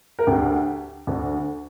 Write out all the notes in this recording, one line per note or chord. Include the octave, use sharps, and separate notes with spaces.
A#4
D2 D3 G4
D2 D3